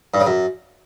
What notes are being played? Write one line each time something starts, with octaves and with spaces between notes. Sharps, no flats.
G2
C#3
F#2